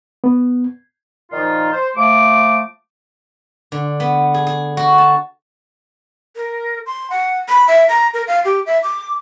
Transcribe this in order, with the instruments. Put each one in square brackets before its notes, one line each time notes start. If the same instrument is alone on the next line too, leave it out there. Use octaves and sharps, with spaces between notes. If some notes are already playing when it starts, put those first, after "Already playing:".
[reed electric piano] B3
[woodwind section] A#2 D#3 F3 D#4 F4
C5
F3 A3 D6
[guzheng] D3
B3
G#4
G#4
F#4
A5
[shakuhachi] A#4
C6
F#5
B5
E5
A#5
A#4
F5
G4
E5
D6